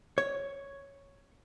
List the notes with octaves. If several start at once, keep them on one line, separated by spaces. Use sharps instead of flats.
C#5